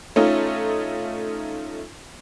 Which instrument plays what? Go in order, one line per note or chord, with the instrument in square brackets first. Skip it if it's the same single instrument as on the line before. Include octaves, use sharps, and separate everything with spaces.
[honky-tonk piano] A3 C#4 D#4 F4